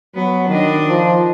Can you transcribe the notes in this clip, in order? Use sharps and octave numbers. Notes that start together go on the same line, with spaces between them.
F#3 B3
D#3 D4 D#5
F3